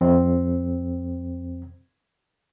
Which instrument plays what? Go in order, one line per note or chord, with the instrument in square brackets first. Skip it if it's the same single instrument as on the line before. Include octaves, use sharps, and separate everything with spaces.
[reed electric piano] F2 C4